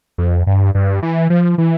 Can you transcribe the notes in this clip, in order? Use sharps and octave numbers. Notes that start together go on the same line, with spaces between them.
F2
G2
G2
E3
F3
E3